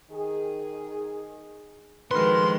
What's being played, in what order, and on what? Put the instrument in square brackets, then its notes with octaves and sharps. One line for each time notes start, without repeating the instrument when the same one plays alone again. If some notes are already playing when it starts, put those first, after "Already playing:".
[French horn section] D#3 G#4
[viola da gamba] D#3 F3 G#3 [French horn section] F#4 A4 [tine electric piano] B4 F6 [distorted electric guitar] C6